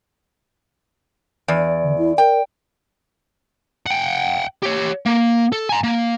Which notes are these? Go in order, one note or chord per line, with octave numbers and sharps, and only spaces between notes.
E2 D5
D3
E4
A#4 G5
F#5 G5
G4 C#5
A#3
A4
G#5 A#5
A#3